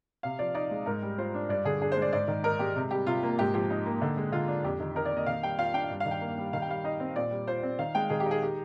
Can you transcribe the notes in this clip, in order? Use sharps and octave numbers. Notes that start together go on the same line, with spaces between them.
C3 F5
F3 D5
D#4 D5
G#3
G#2 A#4
G3
F4 C5
D4
G2 D5
D3 G#4
D4 G#4
C5
G#3
D5
G#2 D5
D#3
D#4 A#4
G#3 G4
C3
G3 G4
C3 F4
A#3
G#2 G4
F3 G4
D#4
A#3
D3
G#3
D3 F4
D4
F2 G4
D#3
D#4 A#4
D5
A#3
D#5
D#3 F5
G3 G5
F4 F5
D4 G5
G2
F5
D#3
G5
A#3
G3
D#3 F5
G5
G3 F5
D#4 D#5
C4
A#2 D5
G3
F4 C5
C4
D#3 F5
G#3 G5
D#3 G#4
G4
D#4
G#4
G4